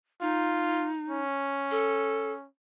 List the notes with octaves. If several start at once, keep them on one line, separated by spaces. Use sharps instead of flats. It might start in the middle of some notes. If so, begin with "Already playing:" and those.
D#4 F4
C#4
A4